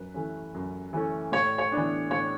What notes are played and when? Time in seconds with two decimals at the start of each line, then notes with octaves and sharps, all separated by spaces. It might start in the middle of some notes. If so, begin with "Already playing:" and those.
Already playing: F#2 B4
0.14 E3 A3 C#4
0.54 F#2
0.93 E3 A3 C#4
1.32 A2 C#5
1.58 C#5
1.72 E3 B3 D4
2.11 A2 C#5